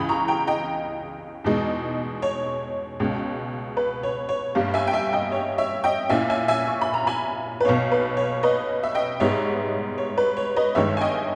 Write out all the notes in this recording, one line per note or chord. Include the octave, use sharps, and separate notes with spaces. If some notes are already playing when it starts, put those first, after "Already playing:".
Already playing: C#2 C#3 E3 B5 D#6
A#5 C#6
G5 A#5
D#5 G5
E2 B2 G#3 D#4
C#5
C#2 B2 G#3
B4
C#5
C#5
G1 G2 G3 A#3
E5 G#5
G5
E5 G#5
D#5 G5
C#5
C#5 E5
D#5 G5
A#2 A#3 C#4 E4 E5 G#5
E5 G#5
E5 G#5
C#6
B5
A#5
G#5 B5
B4
B1 B2 A#3 C#5
B4
C#5
B4 D#5
E5
D#5 G5
G#2 G3 B3 D#4 C#5 E5
C#5
B4
C#5
B4 D#5
G1 G2 D#3 G#3 C#5 E5
G#5
D#5 G5